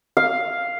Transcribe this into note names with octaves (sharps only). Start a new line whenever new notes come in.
F5